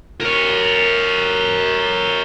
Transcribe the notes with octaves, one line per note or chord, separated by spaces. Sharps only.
A#4 C#5